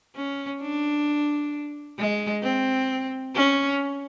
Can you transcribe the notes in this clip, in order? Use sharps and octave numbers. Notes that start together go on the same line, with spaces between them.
C#4
D4
G#3
C4
C#4